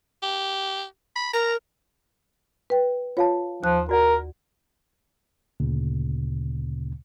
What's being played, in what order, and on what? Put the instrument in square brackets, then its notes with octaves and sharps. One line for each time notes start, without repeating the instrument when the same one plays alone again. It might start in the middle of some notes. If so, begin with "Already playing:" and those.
[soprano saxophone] G4
B5
[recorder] A#4 [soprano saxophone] A#5
[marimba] B4 G5
[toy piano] F4 F5 A5 [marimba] C#5
[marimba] D#2 F#6 [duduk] F3
[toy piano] F#4 D5 F#5 [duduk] A#4
[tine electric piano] D2 A#2 C#3